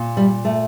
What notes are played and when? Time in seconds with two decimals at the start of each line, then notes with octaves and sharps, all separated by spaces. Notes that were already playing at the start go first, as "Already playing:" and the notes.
Already playing: A#2
0.17 G3
0.45 A3